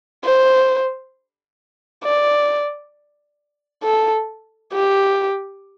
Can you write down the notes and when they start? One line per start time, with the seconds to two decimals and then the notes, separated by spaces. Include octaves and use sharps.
0.24 C5
2.04 D5
3.83 A4
4.73 G4